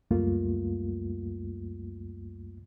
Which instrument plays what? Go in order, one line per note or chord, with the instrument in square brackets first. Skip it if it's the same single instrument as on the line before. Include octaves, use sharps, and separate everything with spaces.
[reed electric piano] C#2 F#2 G3 A3 A#3 F4